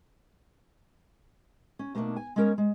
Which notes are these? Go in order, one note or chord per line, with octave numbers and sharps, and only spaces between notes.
C#4
B2 A3 A#3 C4 D4 D#4
G#5
G#3 B3 C#4 A#4 C#5
G#3